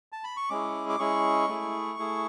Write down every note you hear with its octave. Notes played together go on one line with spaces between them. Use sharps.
A5
B5
C#6
G#3 C#4 E4 G#4 D6
D6
G#3 C#4 E4 G#4 C#6
A3 E4 G#4
A3 E4 G#4